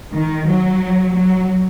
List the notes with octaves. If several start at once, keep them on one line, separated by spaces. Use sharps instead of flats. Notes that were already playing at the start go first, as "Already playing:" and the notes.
D#3
F#3
F#3